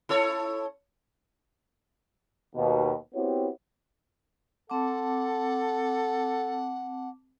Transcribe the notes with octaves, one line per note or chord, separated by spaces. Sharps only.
E4 A4 C#5
D#2 B2
B3 C4 E4 F#4 G4 C#5
C4 A4 F#5 A5 D6